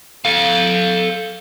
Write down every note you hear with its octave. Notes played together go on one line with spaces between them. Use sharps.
A4 F5